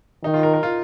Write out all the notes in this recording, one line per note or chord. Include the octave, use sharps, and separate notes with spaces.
D#3 D#4
F4
A#4
A#4
F4